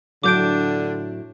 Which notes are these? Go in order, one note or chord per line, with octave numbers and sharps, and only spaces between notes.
A2 D3 F#3 D4 D6 G6 D7